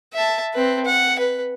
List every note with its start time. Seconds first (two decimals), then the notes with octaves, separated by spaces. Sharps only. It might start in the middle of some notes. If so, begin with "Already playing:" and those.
0.14 E5 A5
0.54 C4 B4
0.85 F#5
1.19 B4